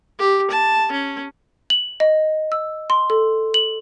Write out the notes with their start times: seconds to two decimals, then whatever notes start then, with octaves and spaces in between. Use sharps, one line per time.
0.19 G4
0.51 A5
0.92 C#4
1.70 F#7
2.00 D#5
2.52 E6
2.90 C6
3.10 A4
3.54 F#7